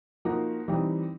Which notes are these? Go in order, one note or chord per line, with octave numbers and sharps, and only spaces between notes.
F3 A#3 D#4 F#4
E3 G3 C4 D#4